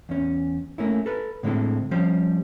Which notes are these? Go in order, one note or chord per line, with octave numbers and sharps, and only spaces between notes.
E2 C#4
A3 A#3 C#4 E4
A4 B4
A2 D3 G#3 C4 E4 A4
F3 G3 C#4 G4 C5